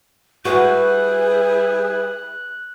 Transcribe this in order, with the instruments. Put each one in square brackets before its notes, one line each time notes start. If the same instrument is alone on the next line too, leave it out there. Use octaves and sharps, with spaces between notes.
[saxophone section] G3 E4 G#4 [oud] F#4 [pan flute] B4 [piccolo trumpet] F#6